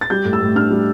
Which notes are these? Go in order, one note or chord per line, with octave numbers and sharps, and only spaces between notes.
A6
G3 G6
A2
E6
A2
D4 F6
G3